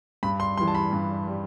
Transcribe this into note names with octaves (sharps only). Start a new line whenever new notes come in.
G2 B5
C6
E3 G3 C6
A5
B5
G2
G3